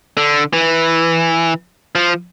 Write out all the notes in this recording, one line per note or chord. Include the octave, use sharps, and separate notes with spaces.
D3
E3
F3